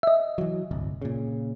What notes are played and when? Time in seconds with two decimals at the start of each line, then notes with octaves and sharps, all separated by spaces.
0.03 D#5 E5
0.38 E3 F#3
0.71 D1 G1 C2
1.02 A#2 C#3